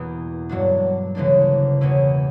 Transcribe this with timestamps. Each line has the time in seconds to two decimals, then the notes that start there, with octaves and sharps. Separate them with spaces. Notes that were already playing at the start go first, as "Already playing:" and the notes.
Already playing: E2 B2 A#3 E4
0.49 G2 F#3 A#3 D4
1.15 D2 C#3 E3 A#3 D4
1.81 E2 B2 A#3 C#4 E4